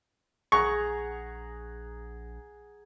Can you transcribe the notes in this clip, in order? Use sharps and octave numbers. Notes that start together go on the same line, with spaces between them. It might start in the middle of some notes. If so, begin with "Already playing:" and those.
A#1 G#4 F#5 A#5 C#6